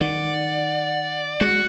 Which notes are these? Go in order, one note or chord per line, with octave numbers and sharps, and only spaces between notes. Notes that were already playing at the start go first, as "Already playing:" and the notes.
D#3 D5 F#5
G#3 F#4